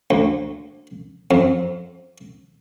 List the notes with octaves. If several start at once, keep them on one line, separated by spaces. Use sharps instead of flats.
D2
F2